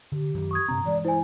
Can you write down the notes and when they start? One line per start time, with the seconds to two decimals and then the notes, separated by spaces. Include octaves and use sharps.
0.12 D3 G4
0.34 F#2 D#3 F#3
0.51 C#6 D#6 G#6
0.68 G2 C3 C4 A#5
0.86 G2 E3 G#3 D5
1.05 E4 C5 G#5